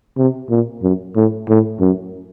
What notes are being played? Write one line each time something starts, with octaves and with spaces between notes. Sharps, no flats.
C3
A#2
F#2
A2
A2
F#2